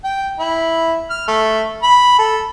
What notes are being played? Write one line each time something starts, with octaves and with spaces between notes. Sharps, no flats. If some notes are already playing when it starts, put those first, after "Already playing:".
G5
E4
F6
A3
B5
A4